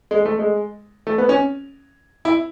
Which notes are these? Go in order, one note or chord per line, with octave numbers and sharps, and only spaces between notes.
G#3
A3
G#3
A3
B3
C#4
E4